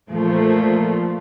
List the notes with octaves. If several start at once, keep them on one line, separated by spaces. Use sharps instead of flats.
A#2 F3 A3